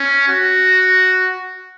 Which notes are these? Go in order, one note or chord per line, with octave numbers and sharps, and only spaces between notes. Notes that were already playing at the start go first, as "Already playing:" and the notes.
Already playing: C#4
F#4